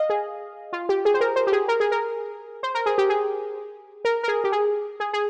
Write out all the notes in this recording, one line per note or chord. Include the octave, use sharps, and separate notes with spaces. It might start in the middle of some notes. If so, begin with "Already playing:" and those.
Already playing: D#5 F5
G#4
F4
G4
G#4
C5
A#4
C5
G4
G#4
A#4
G#4
A#4
C5
A#4
G#4
G4
G#4
A#4
A#4
G#4
G4
G#4
G#4
G#4